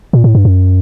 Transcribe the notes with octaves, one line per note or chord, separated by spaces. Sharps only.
A#2
A2
G2
F#2